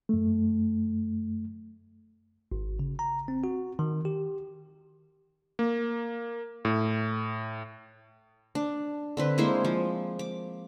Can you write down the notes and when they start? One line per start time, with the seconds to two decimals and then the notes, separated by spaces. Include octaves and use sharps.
0.09 F#2 A3
2.52 G#1
2.79 C#3
2.99 A#5
3.28 C4
3.44 F#4
3.79 D#3
4.05 G4
5.59 A#3
6.65 A2
8.55 D4
9.17 D3 C4 B4
9.38 G#3 A#3 E4 C5
9.65 F3
10.19 D6